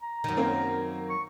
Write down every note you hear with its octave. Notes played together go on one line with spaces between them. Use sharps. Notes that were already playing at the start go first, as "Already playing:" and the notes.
A#5
F#2 D#3
A#3 C4 C#4
C#6